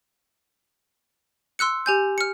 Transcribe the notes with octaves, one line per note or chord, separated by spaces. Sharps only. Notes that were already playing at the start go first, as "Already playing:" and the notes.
C6 E6 F#6 C#7
G4 G#5 G6
F6 C#7